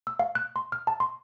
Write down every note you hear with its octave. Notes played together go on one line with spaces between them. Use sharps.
E6
F5
F#6
C6
F6
A5
C6